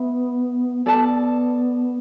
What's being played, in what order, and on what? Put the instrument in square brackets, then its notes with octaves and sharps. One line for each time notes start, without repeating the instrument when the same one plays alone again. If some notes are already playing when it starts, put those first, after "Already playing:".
Already playing: [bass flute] B3 [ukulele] E5 B5
[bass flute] B3 [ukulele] A4 D5 A5